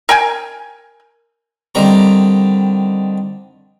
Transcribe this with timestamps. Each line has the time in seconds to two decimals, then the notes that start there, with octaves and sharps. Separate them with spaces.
0.09 A#4 G5 G#5
1.75 D3 D#3 G3 C4 A#5